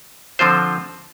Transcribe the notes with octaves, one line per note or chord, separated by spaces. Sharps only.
D3 F3 C4 F4 C5